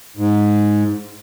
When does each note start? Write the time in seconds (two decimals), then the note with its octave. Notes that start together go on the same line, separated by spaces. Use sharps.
0.17 G#2